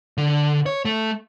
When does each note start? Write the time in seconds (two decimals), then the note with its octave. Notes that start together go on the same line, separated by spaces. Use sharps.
0.18 D3
0.66 C#5
0.85 A3